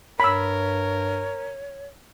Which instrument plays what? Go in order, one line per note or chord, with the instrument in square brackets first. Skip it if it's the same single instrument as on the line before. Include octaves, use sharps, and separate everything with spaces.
[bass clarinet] G2 [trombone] A#4 [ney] C#5 [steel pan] B5 E6